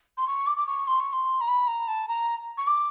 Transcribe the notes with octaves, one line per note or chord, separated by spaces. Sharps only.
C6
C#6
D6
D6
C#6
C6
C#6
C6
A#5
B5
A#5
A5
A#5
C#6
D6